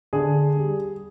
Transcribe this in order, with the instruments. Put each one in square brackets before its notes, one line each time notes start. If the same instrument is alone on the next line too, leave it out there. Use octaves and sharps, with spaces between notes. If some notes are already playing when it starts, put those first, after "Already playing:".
[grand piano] D3 G#4
G3